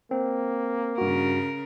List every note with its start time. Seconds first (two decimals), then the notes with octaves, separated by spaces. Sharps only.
0.11 A#3 C4
0.98 G2 C#3 F#4 A#4